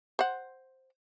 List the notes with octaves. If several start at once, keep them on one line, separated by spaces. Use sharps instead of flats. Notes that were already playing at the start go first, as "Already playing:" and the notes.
C5 F#5